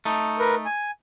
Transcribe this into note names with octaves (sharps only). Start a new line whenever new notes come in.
A3 D#4
A#4 B4
G#5